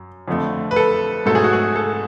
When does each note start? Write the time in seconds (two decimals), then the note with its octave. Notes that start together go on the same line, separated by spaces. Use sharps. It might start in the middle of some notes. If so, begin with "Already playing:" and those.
Already playing: F#2
0.28 F2 D3 F3 A3
0.71 B4
0.76 A4
1.26 G#2 F#3 A3 A4
1.35 G#4
1.44 F#4
1.53 G#4
1.76 A4